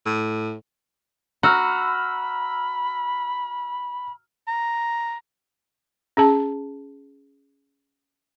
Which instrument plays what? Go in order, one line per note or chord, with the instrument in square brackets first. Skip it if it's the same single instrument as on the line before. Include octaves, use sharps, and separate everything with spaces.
[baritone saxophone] A2
[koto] F#4 [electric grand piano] A#5 E6 F6 [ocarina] B5
[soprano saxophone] A#5
[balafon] C#4 G#4 A5